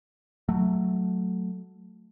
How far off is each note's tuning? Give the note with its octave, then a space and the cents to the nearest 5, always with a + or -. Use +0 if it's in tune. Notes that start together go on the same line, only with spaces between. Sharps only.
F#3 +0 A3 +0